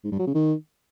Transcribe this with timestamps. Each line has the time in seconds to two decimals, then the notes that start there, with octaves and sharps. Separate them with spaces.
0.04 G#2
0.12 G2
0.19 F#3
0.27 C#3
0.34 D#3